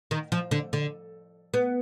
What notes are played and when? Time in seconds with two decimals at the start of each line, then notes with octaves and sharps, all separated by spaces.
0.11 D#3
0.32 F3
0.51 D3
0.73 D3
1.54 B3